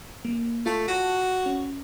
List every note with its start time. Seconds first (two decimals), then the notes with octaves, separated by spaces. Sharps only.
0.25 A#3
0.66 A3 F4 A5
0.88 F#4
1.46 C#4